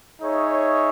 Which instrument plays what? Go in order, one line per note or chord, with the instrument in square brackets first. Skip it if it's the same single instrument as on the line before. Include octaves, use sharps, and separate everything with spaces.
[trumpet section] D#4 G#4 C#5 E5